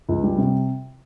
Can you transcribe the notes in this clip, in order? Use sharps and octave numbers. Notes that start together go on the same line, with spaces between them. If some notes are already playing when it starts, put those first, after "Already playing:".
C#2
G3
C3